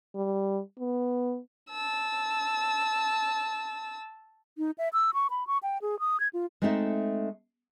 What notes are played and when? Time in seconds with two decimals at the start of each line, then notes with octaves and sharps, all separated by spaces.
0.15 G3
0.79 B3
1.70 A5 E6
4.58 D#4
4.78 E5
4.93 E6
5.14 C#6
5.30 B5
5.47 C#6
5.63 G5
5.82 G#4
6.00 D#6
6.20 G#6
6.33 F4
6.62 G#3 A3 C4 D#4 A4 E5